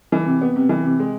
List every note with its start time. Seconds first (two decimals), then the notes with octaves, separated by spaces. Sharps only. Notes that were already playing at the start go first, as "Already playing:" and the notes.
0.12 E3
0.26 C3
0.41 B3
0.56 C3
0.69 E3
0.85 C3
0.99 G#3